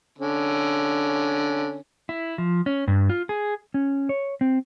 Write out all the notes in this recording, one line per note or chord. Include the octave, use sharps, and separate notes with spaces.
D3 C#4
E4
F3
C#4
G2
F4
G#4
C#4
C#5
C4